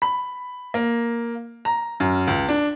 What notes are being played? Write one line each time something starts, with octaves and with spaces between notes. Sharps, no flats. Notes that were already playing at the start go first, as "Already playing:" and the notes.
B5
A#3
A#5
F#2
C#2
D4